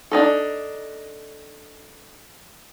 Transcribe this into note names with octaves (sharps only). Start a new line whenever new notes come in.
D4 D#4 A4